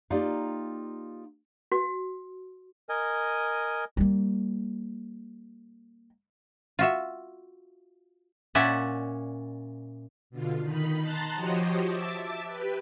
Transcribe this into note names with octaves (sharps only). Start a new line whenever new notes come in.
A#3 D#4 F4 G4 D5 F5
F#4
A#4 D#5 G#5
G3 A#3
F4 F#4 E5
A#2 C#4 D5 E5 F#5
B2 D3 F4
D#3 D#4 B5
A5 A#5 C6 F#6 A6
F3 F#4 G4 C5 C#5 D#5
E5 A5 D6
G4 B4